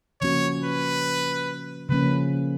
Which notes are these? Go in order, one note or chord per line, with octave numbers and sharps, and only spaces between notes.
C#3 F3 A#3 C#4 F#4 C#5
B4
C#3 F3 A#3 C#4 B4